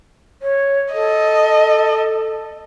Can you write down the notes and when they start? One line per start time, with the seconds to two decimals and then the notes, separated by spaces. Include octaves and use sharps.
0.42 C#5
0.94 A4 D#5